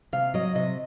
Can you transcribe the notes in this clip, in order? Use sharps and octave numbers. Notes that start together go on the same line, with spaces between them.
C3 F5
F#3 D#5
C3 D#5